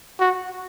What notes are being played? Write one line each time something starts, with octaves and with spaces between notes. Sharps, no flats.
F#4